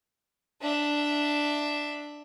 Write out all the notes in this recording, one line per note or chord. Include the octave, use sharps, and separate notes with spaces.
D4 E5